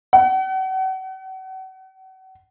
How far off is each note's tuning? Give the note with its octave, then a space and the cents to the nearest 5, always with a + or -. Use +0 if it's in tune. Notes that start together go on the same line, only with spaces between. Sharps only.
F#5 +40